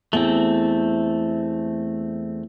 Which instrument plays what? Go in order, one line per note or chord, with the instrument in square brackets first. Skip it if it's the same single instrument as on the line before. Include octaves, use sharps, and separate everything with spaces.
[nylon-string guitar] E2 E5 [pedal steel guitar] A3 C4